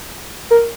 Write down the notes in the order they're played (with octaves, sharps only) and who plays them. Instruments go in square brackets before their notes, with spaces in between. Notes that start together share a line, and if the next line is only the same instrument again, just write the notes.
[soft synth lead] A#4